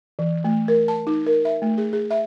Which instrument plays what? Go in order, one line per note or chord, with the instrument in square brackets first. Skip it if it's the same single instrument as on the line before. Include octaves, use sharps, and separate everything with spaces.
[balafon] E3
A3
A#4
A5
D#4
A#4
E5
A3
G#4
G#4
E5